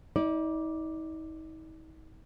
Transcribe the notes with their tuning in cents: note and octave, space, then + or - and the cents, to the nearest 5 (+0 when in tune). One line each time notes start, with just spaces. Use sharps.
D#4 +40 D5 +0